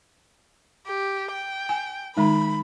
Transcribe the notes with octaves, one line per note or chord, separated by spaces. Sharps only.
G4
G5
G#5
D#3 G#3 D#4 B5